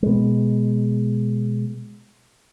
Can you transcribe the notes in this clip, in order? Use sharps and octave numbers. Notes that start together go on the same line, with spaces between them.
B2 G#3